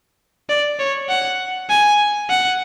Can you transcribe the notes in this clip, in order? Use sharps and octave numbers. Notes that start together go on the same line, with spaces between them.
D5
C#5
F#5
G#5
F#5